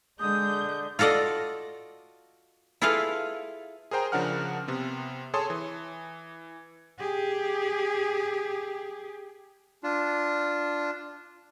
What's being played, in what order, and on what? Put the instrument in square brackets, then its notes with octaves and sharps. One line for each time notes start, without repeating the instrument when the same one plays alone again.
[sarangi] D3 [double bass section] G#3 [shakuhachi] D#6 [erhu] G6
[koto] F4 F#4 A4 D5 D#5
E4 F4 G#4 A4 B4 F5
[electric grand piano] G#4 A#4 C5 G5 A#5
C#3 F3 D4 A#4 F#5 F6
C3 B3
G#4 A4 C#5 A5 C6 D#6
E3
[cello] G4 G#4
[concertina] D4 F4